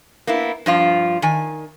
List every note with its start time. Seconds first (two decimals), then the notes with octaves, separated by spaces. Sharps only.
0.27 A#3 B3 E4
0.66 G2 F3 F4
1.22 D#3 G#5